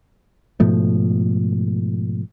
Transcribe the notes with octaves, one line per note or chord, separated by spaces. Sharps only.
G#2 B2 F3 A3